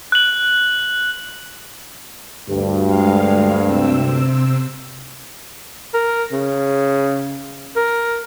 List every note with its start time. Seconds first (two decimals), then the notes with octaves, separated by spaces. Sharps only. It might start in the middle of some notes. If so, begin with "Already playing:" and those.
0.12 F#6 F#7
2.49 D2 G2
2.84 G#3 F5
3.64 C3 C4 E6
5.94 A#4
6.32 C#3
7.76 A#4